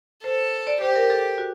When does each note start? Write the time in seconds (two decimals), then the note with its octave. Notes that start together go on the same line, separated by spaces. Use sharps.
0.24 A4 C5
0.67 D5
0.81 G4 C5
0.96 A#4
1.10 A4
1.38 F#4